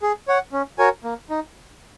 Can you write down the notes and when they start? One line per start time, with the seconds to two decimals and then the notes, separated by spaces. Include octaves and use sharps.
0.02 G#4
0.28 C#5 F#5
0.52 C#4
0.78 F#4 A#4 C#5 G#5
1.04 A#3
1.30 D#4